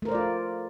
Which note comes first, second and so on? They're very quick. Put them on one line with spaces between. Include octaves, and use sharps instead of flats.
A3 A#4 C5 D5 F4